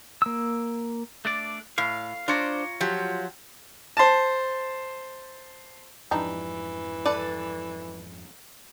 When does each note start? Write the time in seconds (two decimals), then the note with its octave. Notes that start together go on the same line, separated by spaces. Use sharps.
0.22 A#3 E6
1.25 A3 D4 D5
1.78 A2 F5
2.28 D4 F4 C5 C#5 A#5
2.80 F3 F#3 G4
3.97 C5 A5
6.11 F2 G#2 E3 F3 G3 D4 D#4
7.05 A4 B4 D5